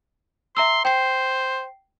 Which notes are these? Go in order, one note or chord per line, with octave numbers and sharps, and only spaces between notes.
E5 A#5 C6 E6
C5 G5 C7